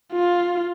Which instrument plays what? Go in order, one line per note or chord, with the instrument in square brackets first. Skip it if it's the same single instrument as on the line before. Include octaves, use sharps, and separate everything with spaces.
[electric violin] F4